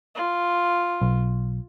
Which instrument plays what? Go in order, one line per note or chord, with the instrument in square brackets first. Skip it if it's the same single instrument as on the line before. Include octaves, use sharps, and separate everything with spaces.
[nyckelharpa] F4
[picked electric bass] B1